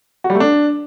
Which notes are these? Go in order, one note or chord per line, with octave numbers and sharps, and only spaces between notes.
F#4
G3
A3
D4